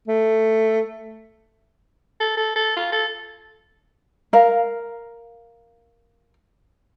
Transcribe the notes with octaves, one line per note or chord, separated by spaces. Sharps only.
A3
A4
A4
A4
F4
A4
A#4 F5